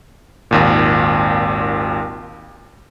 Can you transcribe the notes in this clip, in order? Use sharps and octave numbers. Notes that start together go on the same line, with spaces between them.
G#1 D#2 A#2